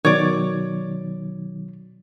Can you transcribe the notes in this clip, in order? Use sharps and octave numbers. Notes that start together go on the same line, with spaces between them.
B2 D#3 F#3 C#5 D5